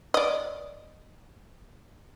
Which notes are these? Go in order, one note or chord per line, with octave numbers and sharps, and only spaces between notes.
D5 D#5